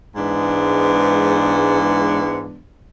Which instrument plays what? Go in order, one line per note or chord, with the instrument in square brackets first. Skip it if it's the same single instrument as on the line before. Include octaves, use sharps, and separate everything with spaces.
[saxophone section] G#2 E3 G#3 B3 D4